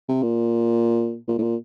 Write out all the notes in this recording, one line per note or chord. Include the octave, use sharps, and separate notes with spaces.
C3
A#2
A#2
A2
A#2